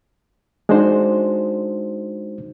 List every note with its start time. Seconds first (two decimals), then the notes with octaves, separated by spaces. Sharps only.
0.69 G#3 D4 D#4 F#4 C5